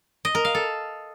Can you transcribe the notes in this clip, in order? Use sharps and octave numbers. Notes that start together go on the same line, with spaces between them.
D#5
A#4
F5
A4